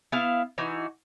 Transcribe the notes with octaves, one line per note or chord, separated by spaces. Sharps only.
B3 E4 F5
E3 D#4 F#4